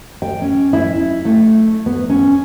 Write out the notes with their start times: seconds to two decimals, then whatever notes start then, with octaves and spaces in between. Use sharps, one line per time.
0.22 G5
0.42 C#4
0.73 E4
1.25 A3
1.86 B3
2.09 C#4